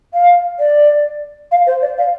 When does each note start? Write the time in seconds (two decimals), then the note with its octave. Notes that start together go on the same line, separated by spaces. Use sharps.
0.14 F5
0.59 D5
1.52 F5
1.67 C5
1.82 D5
1.98 F5